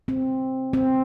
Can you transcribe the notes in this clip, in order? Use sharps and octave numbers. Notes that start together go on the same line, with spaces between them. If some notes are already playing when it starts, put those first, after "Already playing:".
C4
C4